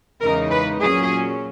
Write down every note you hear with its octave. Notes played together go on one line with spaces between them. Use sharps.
E2 C#3 E3 G#3 D#4 A#4
B4
A#2 F#3 C#4 G#4